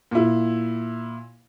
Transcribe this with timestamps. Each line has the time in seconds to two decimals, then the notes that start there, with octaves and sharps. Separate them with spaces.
0.11 A#2 E4